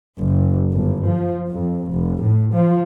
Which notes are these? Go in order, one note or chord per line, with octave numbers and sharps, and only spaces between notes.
F#1
G1
F3
F2
F1
A2
F3